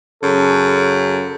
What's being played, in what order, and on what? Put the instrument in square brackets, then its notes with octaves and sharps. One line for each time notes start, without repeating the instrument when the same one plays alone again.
[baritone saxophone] F#2 [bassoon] C#3 [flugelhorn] A4